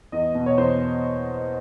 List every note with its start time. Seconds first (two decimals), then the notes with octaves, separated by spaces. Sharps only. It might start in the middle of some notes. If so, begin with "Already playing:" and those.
0.12 E2 D#5
0.35 B2
0.46 C#5
0.58 E2 C5